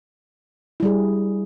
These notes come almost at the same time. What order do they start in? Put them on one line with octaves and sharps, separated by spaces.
E4 G3 G#4